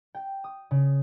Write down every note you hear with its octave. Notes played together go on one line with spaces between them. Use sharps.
G5
D#6
C#3